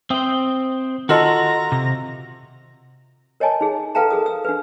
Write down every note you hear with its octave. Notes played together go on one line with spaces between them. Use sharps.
C4 C5 E5 G5 D#6
D#3 F4 F#4 A4 D#5 F#5 A#5 C6
C3
A#4 C#5 D#5 G#5 A5
D#4 G#4
A4 B4 F5 G5 A5 A#5
G#4 A#4 D#6
E6
D4 B4